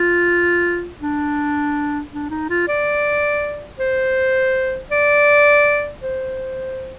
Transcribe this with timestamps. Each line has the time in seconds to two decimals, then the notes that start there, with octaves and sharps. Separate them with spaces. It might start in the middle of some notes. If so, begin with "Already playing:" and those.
Already playing: F4
1.01 D4
2.12 D4
2.30 D#4
2.49 F4
2.68 D5
3.79 C5
4.91 D5
6.02 C5